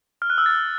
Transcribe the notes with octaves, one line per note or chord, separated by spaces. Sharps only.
F6
F#6
E6
A6